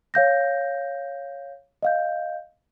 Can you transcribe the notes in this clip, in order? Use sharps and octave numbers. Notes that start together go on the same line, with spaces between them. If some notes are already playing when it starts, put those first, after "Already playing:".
C#5 F5 G6 A#6
D#5 F5 G6